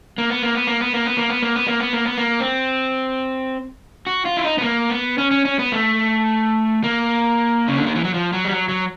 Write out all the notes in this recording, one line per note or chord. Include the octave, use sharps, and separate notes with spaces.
A#3
B3
A#3
B3
A#3
B3
A#3
B3
A#3
B3
A#3
B3
A#3
B3
A#3
B3
A#3
C4
F#4
F4
E4
D#4
B3
A#3
B3
C#4
C#4
C#4
B3
A3
A#3
C#3
D3
D#3
E3
F#3
F3
F#3
G3
F#3
F#3